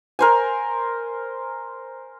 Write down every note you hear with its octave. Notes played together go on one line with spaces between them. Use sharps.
A#4 C5 G#5